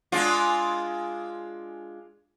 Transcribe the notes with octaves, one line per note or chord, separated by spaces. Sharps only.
G#3 D4 F4